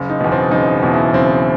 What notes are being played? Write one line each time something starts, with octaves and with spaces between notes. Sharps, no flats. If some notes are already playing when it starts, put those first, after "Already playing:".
Already playing: F#1
D#4
E2 B2
C4
F#1 D#4
E2 B2
E4
F#1 C4